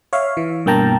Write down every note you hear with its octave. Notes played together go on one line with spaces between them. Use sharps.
C#5 E5 F5
E3
G2 B2 A#3 G5 A5 A#5